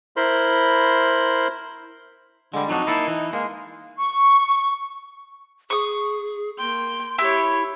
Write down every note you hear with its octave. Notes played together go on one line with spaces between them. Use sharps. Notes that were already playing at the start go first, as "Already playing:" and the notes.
E4 A#4 C5 B5 C6
D3 G3 G#3
F2 F#3 D4 D#4
A#3 E4 A4
E3
G#3 A#3
C#6
G#4 C#6 D#6
A#3 G5 C6
E4 G4 C#5